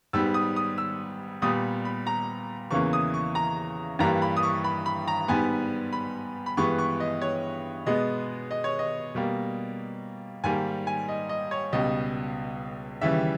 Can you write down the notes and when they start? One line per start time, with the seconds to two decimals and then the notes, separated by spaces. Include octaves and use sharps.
0.13 G#2 G3 B3 E6
0.34 D#6
0.56 D#6
0.78 E6
1.42 A#2 G3 B3 D#6
1.85 B5
2.07 A#5
2.71 E2 C#3 E3 A#3 C#6
2.93 D#6
3.14 C#6
3.35 A#5
3.99 G2 E3 G3 A#3 A#5
4.22 B5
4.37 D#6
4.43 C#6
4.64 B5
4.86 B5
5.08 A#5
5.28 G#2 G3 B3 G#5
5.93 B5
6.46 B5
6.57 G2 E3 G#3 B3 C#6
6.79 C#6
7.00 D#5
7.22 C#5
7.86 B2 G#3 B3 D#5
8.51 D#5
8.64 C#5
8.79 D#5
9.15 B2 G3 A#3
10.44 G#2 D#3 G3 A#3 G#5
10.87 G#5
11.08 D#5
11.29 D#5
11.51 C#5
11.73 C#2 B2 G3 D#5
13.01 D#2 C#3 E3 G3 E5